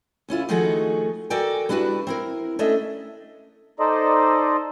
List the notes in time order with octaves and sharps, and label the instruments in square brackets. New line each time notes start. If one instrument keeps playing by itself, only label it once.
[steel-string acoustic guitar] D2 C#4 E4 F4
D#3 F3 A3 D#4 F#4 G#4
F#4 A4 A#4 D5 G5 G#5
G3 D4 E4 F#4 B4
C4 E4 A#4
A3 C#4 D4 D#5 E5
[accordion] D#4 A4 C5 D5 D#5